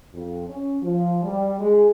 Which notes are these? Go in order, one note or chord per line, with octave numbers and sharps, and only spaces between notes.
F2
C#4
F3
G3
G#3